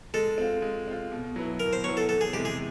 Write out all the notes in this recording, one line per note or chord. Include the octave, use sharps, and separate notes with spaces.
G#3 A4
C4 F4
G#3
C4 F4
B2
F#3 B3 E4
B2 A#4
C5
F#3 B3 E4 C#5
A4
E2 A4
G#4
C3 E3 G#3 G4
G#4